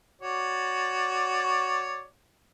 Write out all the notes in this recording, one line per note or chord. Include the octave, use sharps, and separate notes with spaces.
F#4 C#5 D5